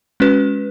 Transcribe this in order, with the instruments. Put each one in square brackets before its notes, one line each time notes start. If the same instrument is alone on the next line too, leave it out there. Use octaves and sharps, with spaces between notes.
[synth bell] G#3 C#4 F#4 B4